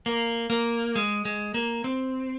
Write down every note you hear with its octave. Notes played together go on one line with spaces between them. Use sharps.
A#3
A#3
G#3
G#3
A#3
C4